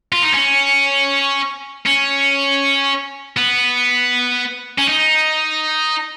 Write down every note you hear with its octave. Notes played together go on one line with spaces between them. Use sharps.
F4
D#4
C#4
C#4
B3
C#4
D#4